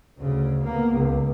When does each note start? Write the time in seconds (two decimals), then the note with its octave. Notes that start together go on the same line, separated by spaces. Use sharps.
0.18 D2 C#3
0.63 A#3 B3
0.94 C#2